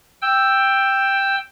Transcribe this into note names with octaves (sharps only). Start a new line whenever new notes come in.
G5 E6